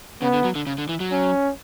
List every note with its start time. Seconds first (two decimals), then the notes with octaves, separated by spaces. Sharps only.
0.22 C#3 B3
0.33 D3
0.44 F#3
0.55 D3
0.67 C#3
0.78 D3
0.89 E3
1.00 F#3
1.11 C#4